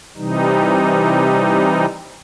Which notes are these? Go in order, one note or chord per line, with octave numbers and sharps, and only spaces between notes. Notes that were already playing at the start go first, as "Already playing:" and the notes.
C3 E3 G3 D#4